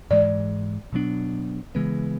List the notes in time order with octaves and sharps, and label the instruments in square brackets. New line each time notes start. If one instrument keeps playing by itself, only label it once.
[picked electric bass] G#2 E3 G#3 [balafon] D5
[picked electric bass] B2 F#3 B3 D4
C#3 E3 G#3 B3